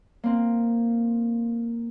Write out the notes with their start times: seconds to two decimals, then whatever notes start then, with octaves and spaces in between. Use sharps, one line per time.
0.24 A#3 C4